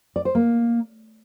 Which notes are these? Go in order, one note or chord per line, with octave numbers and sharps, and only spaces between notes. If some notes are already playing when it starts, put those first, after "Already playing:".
D5
C5
A#3